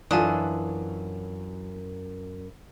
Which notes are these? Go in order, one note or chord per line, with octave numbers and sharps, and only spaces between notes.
F#2 E3 D4 F4 A4 G#5 A5 D#6